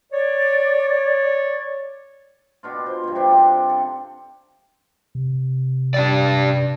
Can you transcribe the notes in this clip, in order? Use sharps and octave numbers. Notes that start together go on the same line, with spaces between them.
C#5 D5
B2 D4 F4
C5
G2 B2
C3 D4 G4
C4 G4 A4
A4
C3
D4 G4 D5